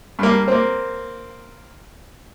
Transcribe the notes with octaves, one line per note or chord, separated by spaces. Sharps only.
G2 A#3
A#3 C4